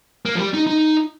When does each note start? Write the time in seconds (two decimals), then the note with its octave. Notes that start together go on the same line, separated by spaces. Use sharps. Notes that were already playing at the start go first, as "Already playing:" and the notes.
0.25 A#3
0.35 F3
0.39 G3
0.54 D#4
0.67 D#4